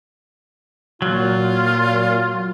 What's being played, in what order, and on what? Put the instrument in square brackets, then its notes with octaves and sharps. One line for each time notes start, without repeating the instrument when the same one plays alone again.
[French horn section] A#2 [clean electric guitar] F#3 [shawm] F4